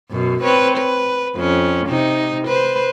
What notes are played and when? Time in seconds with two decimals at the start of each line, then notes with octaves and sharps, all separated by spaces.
0.11 F#2 B2
0.42 C4 B4 C#5
0.78 B4
1.36 F2 C#4
1.88 C3 D#4
2.48 B4 C5